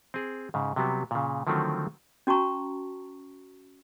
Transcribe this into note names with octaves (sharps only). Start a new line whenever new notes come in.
C4 G#4
G#2 C#3
C3 F#3 G3 B3
A#2 C#3
D3 D#3 F3 F#3 A3 C4
C#4 F#4 A5 A#5 C#6